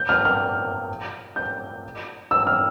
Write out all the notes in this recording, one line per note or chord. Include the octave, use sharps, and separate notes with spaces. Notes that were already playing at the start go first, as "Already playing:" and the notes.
Already playing: G6
F6
F6
G6
E6
F6